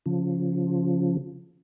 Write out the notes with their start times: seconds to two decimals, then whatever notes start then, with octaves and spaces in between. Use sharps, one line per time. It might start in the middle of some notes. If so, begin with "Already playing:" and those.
0.06 C#3 F3